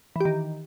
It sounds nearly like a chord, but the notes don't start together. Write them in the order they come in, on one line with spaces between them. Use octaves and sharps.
E3 G4 D#3